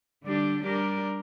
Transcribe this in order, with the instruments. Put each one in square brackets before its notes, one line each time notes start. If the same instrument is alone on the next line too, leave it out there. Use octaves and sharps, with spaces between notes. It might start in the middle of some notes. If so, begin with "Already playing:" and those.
[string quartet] D3 G3 D4 G4
G3 D4 G4 A#4